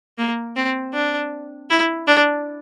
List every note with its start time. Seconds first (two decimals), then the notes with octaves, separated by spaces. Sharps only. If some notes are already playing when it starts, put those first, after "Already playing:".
0.18 A#3
0.56 C4
0.94 D4
1.70 E4
2.07 D4